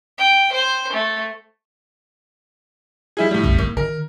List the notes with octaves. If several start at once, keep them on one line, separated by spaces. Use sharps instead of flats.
G5
C5
A3
G3 E4 G#4
A2 G3
B1 F#2
A#3
D#3 A#4